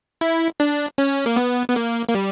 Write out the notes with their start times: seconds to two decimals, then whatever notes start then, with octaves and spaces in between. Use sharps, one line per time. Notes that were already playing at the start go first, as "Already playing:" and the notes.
0.21 E4
0.60 D4
0.98 C#4
1.26 A#3
1.36 B3
1.68 B3
1.76 A#3
2.08 A#3
2.15 G3